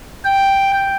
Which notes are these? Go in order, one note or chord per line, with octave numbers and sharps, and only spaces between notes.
G5